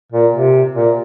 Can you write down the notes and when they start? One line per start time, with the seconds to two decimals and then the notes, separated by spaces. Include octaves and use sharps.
0.12 A#2
0.33 C3
0.75 A#2